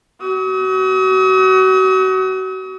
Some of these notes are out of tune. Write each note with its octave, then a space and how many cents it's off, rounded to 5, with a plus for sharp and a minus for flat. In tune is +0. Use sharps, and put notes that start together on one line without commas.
F#4 +30 D#6 +45